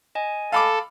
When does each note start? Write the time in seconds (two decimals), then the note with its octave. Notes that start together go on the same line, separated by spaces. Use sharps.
0.15 D#5 G#5
0.52 A4 F5 B5 D6